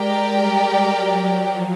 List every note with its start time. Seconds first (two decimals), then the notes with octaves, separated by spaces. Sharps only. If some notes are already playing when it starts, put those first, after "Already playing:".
Already playing: G#3 G4 A#4 D5 G5
0.41 G3
0.93 F#3
1.45 F3